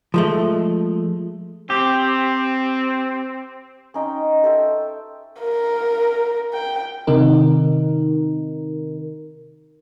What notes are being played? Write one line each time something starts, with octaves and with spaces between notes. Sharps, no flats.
F3 G#3 A3
C4 G4
C#4 D#4 G5 C6
A4 C5 E5 G5
A#4
G5
C3 D#3 D#4 A#4